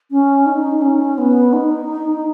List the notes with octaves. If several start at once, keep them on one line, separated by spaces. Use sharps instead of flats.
C#4
D#4
C#4
B3
D#4